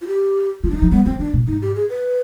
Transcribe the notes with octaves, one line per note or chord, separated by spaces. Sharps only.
F4
G4
D3 F4
D#3 D4
F3 D#4
G3 B3
F3 C4
D#3 D4
B2
G#2 D#4
G4
G#4
B4